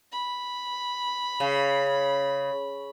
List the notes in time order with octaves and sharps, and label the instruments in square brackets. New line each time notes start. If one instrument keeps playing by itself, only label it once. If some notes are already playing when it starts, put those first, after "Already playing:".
[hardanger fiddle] B5
[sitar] C#3